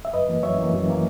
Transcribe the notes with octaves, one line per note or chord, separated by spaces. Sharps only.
E5
F#2 B4 D#5
E3 A#3
F#2 C#5 E5
E3 A#3
F#2
E3 A#3